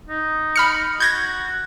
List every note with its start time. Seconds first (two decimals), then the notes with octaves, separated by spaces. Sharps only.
0.08 D#4
0.56 B5 F6 C#7
1.00 F#4 G6 G#6 A#6